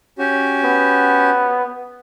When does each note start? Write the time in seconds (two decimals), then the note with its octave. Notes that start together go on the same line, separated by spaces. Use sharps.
0.19 C#4 F#4 G4
0.65 B3